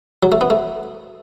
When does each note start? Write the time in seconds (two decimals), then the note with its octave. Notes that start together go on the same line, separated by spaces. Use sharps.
0.23 F#3
0.32 A3
0.41 B3
0.50 A3